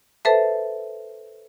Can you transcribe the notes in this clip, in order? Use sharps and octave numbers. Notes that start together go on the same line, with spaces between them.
A4 B4 C5 E5 A5